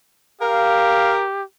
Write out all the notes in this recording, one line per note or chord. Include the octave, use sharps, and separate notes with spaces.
G4 A#4 F5